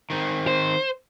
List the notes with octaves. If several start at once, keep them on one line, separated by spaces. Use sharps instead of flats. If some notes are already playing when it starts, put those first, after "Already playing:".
D#3 C4
C5